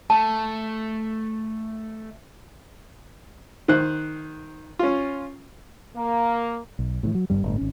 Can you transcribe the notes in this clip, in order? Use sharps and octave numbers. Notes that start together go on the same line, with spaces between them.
A3 A5
D#3 C5 F#6
C#4 F4
A#3
B1
A2 C3 E3
F#3
G1 E2 G2 G3
G1 A2
G#1 C#4